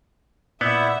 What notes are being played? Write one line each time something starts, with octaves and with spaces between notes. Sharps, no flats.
A#2 B3 E4 D5 E5 F#5 G6